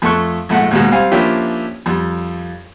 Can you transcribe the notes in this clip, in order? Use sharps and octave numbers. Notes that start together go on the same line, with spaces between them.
F2 A3 A4 C#6 F#6
A#1 G#2 A3 F#5
D#2 G#2 B2
G3 C4 F5 G#5
F3 A#3 C#4 D4 E4 G4
F2 G3